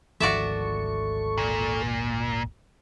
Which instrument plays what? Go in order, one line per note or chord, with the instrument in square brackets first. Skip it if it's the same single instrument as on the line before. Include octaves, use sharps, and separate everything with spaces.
[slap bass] G#1 D2 F3 [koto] F#4 D5 E5 [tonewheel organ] A4 C#6
[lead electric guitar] A#2